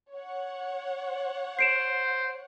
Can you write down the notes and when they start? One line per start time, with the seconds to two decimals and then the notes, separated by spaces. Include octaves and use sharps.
0.13 C#5 F#5
1.59 C5 C7 D7 E7